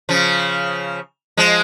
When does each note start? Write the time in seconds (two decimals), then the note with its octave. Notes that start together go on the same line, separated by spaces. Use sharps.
0.09 C#3 F3
1.37 F3 G#3